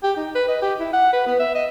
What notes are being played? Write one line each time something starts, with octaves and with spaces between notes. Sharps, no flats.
G4
D#4
B4
D#5
G4
E4
F#5
B4
B3
E5
D#5